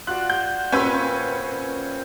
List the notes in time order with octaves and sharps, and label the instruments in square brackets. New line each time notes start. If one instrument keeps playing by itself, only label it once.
[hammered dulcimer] F4 F#4 D5 [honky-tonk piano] F#6
[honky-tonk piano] G6
[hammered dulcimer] A#2 C4 G5 [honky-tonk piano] C#4 B4